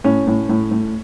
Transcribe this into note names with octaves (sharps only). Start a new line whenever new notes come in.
A2 C#4
A2
A2
A2